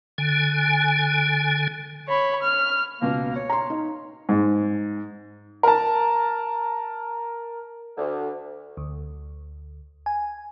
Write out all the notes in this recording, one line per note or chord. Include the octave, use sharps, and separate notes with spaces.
D3 G#5
C#5 B5
F6
C#2 B2 A#3
C#5
A#5 C6
D#4
G#2
A#4 A5
D2
D2
G#5